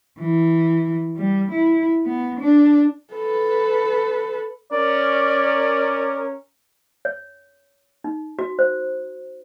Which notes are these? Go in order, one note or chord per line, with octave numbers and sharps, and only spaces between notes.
E3
G3
E4
B3
D4
A4 B4
C#4 A#4 D5
C#5
D#4
F#4
C5